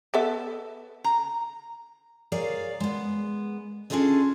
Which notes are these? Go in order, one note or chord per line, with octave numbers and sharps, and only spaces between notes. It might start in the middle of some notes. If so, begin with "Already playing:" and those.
B3 A4 E5
A#5
G#4 A#4 C#5 D5 F5
G#3 B3
C#4 D4 F4 G#4 A4 D#5